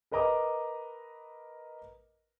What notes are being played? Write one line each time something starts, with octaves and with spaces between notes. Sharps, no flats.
A#4 B4 D#5 A#5 D6 D#6